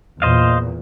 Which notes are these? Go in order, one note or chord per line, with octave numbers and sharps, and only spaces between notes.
E2 A#2 C5 D#5 F5